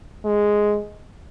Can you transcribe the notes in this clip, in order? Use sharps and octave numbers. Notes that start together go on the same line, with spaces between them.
G#3